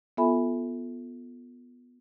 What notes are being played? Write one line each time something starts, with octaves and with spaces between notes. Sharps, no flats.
B3 F4 A4 E5 G#5 B5